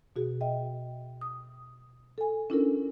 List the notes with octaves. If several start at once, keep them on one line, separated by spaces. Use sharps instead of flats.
B2 F#4 G#4
D#5 E5 G5
D#6
A4 G#5
C#4 D4 E4 F4 A4 A#4